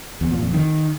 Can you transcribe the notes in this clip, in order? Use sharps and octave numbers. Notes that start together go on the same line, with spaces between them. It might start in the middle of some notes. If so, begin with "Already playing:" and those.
E2
A#2
F2
D#3